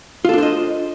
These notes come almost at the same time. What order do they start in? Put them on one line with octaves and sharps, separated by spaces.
F4 A4 D4 C5 D#5